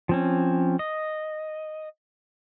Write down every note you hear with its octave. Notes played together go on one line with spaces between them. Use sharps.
F3 C4 C#4
D#5